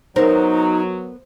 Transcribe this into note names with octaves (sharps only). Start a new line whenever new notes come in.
F#3 B3 D#4 A#4 C5